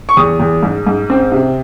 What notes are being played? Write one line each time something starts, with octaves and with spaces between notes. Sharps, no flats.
C#6
E2 D#6
E2
G#2
G#2
C4
C3